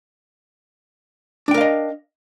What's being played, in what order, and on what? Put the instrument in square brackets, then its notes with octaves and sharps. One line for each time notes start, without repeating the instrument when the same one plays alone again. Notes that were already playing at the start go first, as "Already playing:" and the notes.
[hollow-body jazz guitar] D4
G5
A#4
F5
D#5